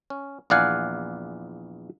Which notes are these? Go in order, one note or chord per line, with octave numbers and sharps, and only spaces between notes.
C#4
A#1 E2 D5 F5 F#5 G#5